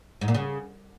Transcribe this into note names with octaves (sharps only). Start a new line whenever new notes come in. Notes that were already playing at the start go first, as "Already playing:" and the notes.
G#2
A#2
C#3